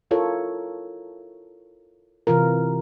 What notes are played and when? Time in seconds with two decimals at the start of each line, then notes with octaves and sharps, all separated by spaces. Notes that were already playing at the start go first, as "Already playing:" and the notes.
0.11 E4 F4 A4 A#4 C#5
2.27 C3 E3 F4 A#4